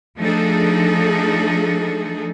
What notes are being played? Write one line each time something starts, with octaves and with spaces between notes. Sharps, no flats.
F3 A3 D4 D#4 G#4 A4